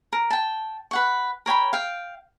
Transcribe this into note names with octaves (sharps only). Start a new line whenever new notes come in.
A#4
G5 A5
B4 F#5 C#6
A#4 C#5 G5 B5
F5 G5